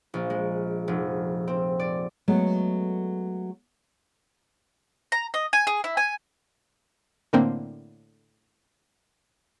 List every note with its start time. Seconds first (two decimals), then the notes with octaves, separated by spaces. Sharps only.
0.14 A#1
0.30 G#3
0.88 F1
1.48 C4
1.79 D5
2.28 F#3 G#3 A3 B3
5.12 A#5
5.34 D#5
5.53 G#5
5.67 G#4
5.84 E4
5.97 G#5
7.33 A2 D3 A#3 C4